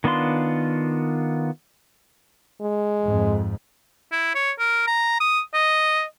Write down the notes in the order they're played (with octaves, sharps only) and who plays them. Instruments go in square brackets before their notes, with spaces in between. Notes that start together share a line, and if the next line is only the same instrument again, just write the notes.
[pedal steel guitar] D#3 B3 D4 F4 C6
[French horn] G#3
[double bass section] F2 G#2
[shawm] E4
C#5
A#4
A#5
D#6
D#5